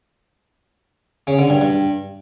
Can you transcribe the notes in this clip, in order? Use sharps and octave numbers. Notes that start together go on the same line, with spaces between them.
C#3
D3
G2
G2